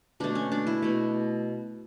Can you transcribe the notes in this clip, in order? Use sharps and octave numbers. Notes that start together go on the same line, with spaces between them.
B2 A3 D4
C#4
D4
E4
B2 A3